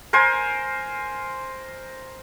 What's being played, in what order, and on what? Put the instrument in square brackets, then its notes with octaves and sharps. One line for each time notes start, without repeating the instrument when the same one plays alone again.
[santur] A#4 C5 G#5